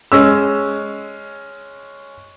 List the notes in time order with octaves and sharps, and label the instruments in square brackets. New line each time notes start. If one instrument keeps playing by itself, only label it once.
[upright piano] G#3 C#4 E6